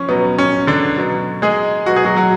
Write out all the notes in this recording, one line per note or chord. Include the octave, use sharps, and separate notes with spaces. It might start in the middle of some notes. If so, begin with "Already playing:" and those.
Already playing: F3 C#4
B2 F#3 B3
C#4
D3 D4
B2 F#3
G#3 G#4
B2 F#3 F#4
G#4
F#3 F#4
F#3 F#4